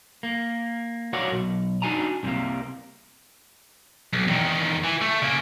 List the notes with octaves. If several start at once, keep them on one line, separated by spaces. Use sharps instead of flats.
A#3
F#4 A#4 C#5 D5 F5 F#5
B1
D4 D#4 F#4 G#5 A#5
C2 C3 F#3 G3 A#3
B1
E2 D#3
E3
A3
C#3 A#3